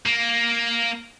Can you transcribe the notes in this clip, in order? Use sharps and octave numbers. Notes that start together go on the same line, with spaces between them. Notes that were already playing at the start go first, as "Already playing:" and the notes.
A#3